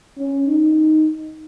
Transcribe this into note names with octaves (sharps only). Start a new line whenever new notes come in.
C#4
D#4